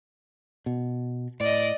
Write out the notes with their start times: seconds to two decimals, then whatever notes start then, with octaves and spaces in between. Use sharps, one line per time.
0.66 B2
1.40 A2 D5 D#5